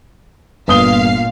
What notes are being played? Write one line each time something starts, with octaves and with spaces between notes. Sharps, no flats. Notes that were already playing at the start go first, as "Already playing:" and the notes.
G1 A#2 F5 D#6 G7